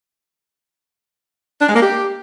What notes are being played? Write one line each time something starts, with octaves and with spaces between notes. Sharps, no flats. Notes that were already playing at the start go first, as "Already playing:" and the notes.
D4
G#3
A#3
G4